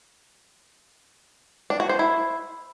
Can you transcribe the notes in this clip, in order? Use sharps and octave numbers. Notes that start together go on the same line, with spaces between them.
D4
F#4
C5
E4